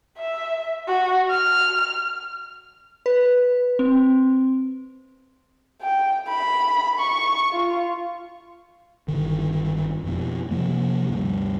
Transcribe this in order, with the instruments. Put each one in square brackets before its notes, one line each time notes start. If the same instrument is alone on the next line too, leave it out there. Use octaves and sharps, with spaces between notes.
[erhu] E5
F#4
F6
[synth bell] B4
C4
[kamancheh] G5
B5
C#6
F4
[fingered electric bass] G1 D3 D#3
F2 B2
C3 F3 A#3
D2 G2